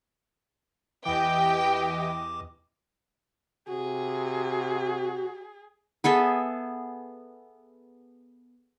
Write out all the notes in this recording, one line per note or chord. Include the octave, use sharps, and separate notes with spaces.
E2 E3 G4 D#5 G5 D6
C3 F#4 G#4
B3 G#4 A4 E5